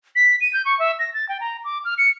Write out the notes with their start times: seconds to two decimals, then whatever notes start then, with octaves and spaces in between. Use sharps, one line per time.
0.16 B6
0.41 D#7
0.53 G6
0.65 C#6
0.79 E5
0.99 A#6
1.14 A6
1.29 G5
1.41 A#5
1.65 D6
1.85 F6
1.98 C#7